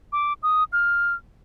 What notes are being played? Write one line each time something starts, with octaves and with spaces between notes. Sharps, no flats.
D6
D#6
F6